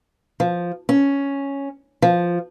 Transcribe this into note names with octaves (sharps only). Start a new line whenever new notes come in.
F3
C#4
F3